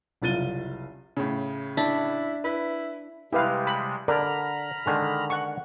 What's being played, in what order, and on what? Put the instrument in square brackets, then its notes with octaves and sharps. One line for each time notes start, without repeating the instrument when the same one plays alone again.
[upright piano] F#1 C2 F4 A6 D#7 G7
A2 C#3
[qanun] D4 [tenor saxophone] E4
[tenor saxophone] E4 [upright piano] B4
[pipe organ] C3 G3 G#3 [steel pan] E4 B4 F5 [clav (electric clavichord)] G4
[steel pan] B5
[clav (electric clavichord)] D3 [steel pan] A#4 D5 [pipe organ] A#5 B5 F6
[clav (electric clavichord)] D3 D#3 G#3
[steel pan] F#5 C#6